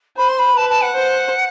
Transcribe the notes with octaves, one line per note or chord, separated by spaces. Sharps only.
C5 B5
C6
B5
B4 A5
A5
F#5
C5